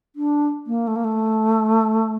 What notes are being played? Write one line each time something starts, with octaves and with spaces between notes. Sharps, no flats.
D4
A#3
A3
A#3
A3